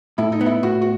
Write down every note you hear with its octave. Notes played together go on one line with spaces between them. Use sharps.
A2 E4
D#4
B3
E4
A2 F#4
F#4